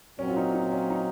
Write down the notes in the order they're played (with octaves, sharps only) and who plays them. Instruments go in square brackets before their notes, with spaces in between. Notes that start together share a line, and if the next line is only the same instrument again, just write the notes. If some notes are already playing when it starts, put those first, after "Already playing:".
[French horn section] A#2 F#3 C4 [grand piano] C#4
[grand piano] F4
D#4
D#4
C#4
D#4